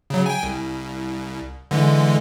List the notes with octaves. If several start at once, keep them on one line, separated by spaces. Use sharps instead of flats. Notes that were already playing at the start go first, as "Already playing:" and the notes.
C#3 F#3
G5 G#5
C2
D3 E3 G#3